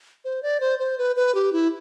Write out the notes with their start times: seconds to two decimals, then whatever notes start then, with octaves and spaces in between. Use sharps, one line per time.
0.25 C5
0.43 D5
0.60 C5
0.79 C5
0.98 B4
1.16 B4
1.35 G4
1.53 E4